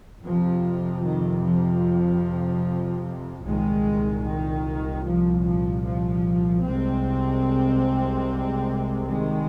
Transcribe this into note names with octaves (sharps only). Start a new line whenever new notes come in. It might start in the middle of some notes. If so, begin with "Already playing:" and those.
F2 C3 F3
D#3
F3
C2 A#2 D#3 G#3
D#3
F3
F3
F3
C2 C3 G#3 C4
D#3 G#3